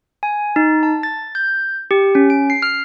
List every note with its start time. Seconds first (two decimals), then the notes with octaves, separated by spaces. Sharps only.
0.23 G#5
0.56 D#4
0.83 A5
1.03 A6
1.35 G6
1.91 G4
2.15 C#4
2.30 D7
2.50 C7
2.62 F6